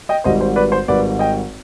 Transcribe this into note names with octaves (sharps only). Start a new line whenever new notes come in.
D#5 G5
G#1 G#2 G3 C5 D#5
C5
B4 D5
C5
G#1 G#2 G3 B4 D5
D#5 G5